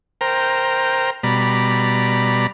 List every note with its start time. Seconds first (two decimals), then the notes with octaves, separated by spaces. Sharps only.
0.21 A#4 C5 G5 A#5
1.23 B2 G3 D5 A#5 B5